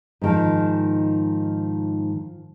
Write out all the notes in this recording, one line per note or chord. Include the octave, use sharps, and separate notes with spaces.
G#2 D#3 F3